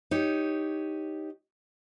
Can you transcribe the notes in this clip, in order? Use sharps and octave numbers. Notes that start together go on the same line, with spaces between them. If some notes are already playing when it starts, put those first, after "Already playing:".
D#4 G4 C#5